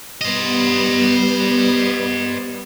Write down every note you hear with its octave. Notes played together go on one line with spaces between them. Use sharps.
G3 B3 C5 D#5